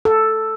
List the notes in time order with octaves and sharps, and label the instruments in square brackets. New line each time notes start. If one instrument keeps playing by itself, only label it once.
[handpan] A4